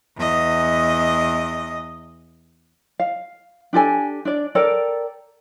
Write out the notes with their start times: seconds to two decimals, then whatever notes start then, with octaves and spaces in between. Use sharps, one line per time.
0.17 E2 D#5
2.99 F5
3.73 D4 G4 A4 G#5
4.25 D4 D5
4.55 A4 A#4 D5 G5